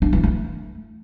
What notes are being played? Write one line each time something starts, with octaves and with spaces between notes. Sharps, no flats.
D4
E3
A3